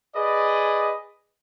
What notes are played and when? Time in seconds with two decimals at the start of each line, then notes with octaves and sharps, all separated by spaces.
0.16 G#4 B4 D5 D#5